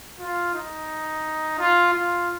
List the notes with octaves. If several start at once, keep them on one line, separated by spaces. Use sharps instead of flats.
F4
D#4
F4
F4